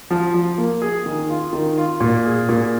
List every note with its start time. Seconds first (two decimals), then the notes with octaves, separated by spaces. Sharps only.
0.11 F3
0.34 F3
0.58 A#3
0.82 G#4
1.06 D#3
1.30 F4
1.53 D#3
1.78 F4
2.00 A#2
2.25 G#4
2.49 A#2